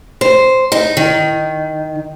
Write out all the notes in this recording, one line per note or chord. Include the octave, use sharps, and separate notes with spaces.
C5
D#4
D#3